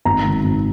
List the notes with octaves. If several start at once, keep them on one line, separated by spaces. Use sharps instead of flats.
G#1 A#5
G#2 D#3
G#1